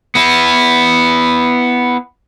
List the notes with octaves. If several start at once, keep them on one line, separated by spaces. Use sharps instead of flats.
B3 E4